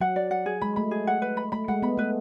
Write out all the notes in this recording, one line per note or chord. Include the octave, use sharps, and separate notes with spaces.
F#3 F#5
D5
F#5
G#4
G#3 B5
A3 B5
G#4
F#5
B4
B5
A3 B5
G#3 F#5
B3 B5
A3 B4